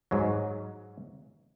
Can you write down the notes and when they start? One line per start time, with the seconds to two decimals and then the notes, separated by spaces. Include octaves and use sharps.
0.11 G#2 F#3